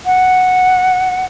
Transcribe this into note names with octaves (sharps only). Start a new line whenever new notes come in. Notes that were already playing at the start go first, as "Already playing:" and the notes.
F#5